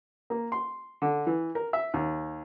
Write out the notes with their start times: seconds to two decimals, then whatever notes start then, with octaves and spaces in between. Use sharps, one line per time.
0.30 A#3
0.52 C6
1.02 D3
1.27 E3
1.55 A#4
1.73 E5
1.94 D#2